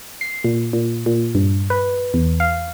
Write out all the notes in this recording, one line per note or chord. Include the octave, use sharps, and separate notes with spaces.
C7
A#2
A#2
A#2
G2
B4
E2
F5